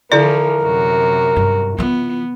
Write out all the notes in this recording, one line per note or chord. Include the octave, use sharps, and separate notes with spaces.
D3 E3 F3 E4 A#4 D5
F#2 C3 F#4
G2
E3 B3 F4